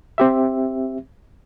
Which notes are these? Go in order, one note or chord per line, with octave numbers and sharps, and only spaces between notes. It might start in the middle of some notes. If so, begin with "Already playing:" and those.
C4 G4 E5